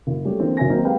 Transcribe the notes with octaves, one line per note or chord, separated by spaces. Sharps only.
F#1
G3 A3 C#4 G4
D3 E3 A#3 C4
F#1 F#3 C#4 E5 G#5 A#6
D#3 F#3 A#3 C4 D#4
G#3 A#3 G4 B4 F5 G5